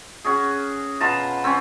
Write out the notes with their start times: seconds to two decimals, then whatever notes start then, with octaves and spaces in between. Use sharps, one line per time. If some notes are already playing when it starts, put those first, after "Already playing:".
0.24 C#4 F#4 G#4
1.00 B2 F4 A5 A#5
1.44 C4 C#4